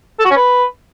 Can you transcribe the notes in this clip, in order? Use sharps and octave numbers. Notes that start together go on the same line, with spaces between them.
A4
F#4
C#4
B4